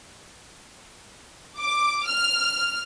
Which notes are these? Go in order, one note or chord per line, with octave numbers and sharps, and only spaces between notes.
D6
F6